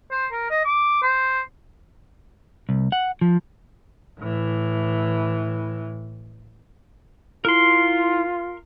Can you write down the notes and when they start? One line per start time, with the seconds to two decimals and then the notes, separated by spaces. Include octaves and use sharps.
0.11 C5
0.32 A#4
0.50 D#5
0.65 D6
1.02 C5
2.69 C2
2.92 F#5
3.21 F3
4.19 A2 E3
7.45 E4 F4 A#4 C6